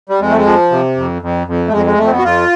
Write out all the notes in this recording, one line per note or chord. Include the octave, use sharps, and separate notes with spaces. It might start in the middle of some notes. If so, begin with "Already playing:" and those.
G3
F2 G#3
A3
G#3
F3
C3
F2
F2
F2
A3
F2 G#3
G#3
F2 A3
C4
B3
F#4
F2 F4